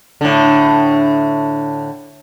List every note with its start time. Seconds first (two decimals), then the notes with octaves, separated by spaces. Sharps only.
0.21 A2 D3